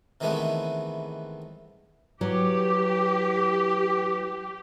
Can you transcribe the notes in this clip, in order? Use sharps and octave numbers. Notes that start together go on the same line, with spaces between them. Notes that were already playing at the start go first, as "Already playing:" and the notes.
C3 D#3 E3 G#3 A3 B3
E3 F#3 G4